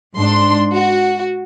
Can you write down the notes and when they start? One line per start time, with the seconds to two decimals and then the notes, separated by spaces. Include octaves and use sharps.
0.16 G#2 D4 C6
0.75 F#4